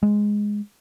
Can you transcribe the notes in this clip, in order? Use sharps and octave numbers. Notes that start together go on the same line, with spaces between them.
G#3